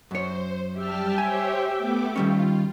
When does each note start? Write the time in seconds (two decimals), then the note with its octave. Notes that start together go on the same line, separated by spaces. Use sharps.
0.11 F#2 C5 C#5
0.76 G3 G4 E5 G5 A5 F6
1.18 C5 C#5 G#5
1.76 A3 B3 D6
2.16 D#3 G3 C#4 F4